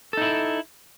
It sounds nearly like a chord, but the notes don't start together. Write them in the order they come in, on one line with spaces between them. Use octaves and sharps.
A4 D#4 E4